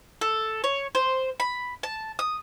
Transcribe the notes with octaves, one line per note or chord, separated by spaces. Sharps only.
A4
C#5
C5
B5
A5
D#6